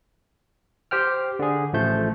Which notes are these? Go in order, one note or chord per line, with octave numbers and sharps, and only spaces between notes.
G4 C5 G5 F6
D3 G#4
A1 F3 A3 G6